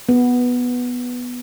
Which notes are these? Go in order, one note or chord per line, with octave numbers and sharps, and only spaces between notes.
B3